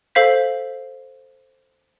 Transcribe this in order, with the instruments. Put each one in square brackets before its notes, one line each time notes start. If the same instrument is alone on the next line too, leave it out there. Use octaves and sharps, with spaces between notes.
[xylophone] A4 C5 F5 G6 B6